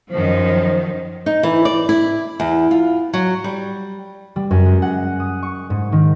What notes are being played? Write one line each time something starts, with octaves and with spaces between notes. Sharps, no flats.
F#2 D#3 F3 C5
D#4
E3
D5
E4
E2
F4
F#3
G3
G3
F#2
G#3
F#5
D#6
C#6
G#2
D#3